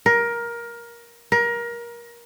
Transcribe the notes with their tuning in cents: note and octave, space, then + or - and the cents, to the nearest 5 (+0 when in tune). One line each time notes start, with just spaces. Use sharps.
A#4 +15
A#4 +25